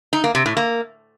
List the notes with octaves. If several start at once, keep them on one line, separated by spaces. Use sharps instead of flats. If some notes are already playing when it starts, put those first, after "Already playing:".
D#4
A#3
C3
A2
A#3